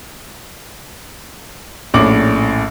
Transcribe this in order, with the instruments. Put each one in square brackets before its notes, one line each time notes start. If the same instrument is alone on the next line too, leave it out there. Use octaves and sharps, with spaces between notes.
[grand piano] A#1 A2 C#4 D6 F#7